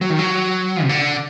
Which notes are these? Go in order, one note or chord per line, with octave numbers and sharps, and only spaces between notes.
F#3
D#3
F#3
C3
D3